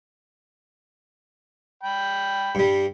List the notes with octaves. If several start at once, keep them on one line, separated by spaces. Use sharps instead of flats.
G5 B5
G2 G3